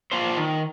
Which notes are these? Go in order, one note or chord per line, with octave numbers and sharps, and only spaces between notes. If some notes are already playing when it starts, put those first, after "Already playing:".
A#3 D4 F4 C5
D#3